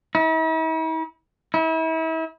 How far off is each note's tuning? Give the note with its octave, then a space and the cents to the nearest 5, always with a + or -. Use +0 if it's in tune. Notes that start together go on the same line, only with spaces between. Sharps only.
E4 -45
E4 -35